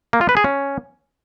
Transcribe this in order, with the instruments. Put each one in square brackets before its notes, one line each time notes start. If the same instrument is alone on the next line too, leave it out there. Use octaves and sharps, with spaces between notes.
[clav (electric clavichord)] A#3
F4
B4
G#4
C#4